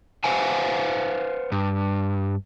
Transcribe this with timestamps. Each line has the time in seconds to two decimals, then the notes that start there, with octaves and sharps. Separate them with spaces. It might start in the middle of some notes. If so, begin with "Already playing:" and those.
0.24 B4 C5 F5 F#5 G#5
1.52 G2